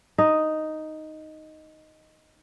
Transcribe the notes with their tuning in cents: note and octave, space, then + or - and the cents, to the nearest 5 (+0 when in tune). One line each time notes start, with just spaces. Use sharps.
D#4 +0 D#5 +0